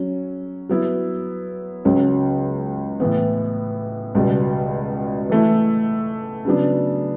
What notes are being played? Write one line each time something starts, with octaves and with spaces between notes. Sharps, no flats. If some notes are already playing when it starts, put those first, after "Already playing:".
Already playing: F#3 C#4
F#3 B3 E4
C#2 C#3 F#3 C#4
A2 E3 B3
C#2 B2 G3
E3 A3 E4
C#3 F#3 B3 D4